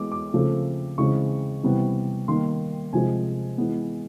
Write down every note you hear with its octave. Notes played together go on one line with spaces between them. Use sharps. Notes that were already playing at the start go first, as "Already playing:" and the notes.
Already playing: E3 G#3 B3 D6
D6
C#3 F3 A3 C4
C#3 E3 G#3 C4 C#6
C3 E3 G3 B3
D#3 G3 A#3 C6
C3 F3 G#3 G#5
E3 G#3 B3